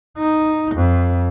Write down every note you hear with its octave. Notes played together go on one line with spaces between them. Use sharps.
D#4
F2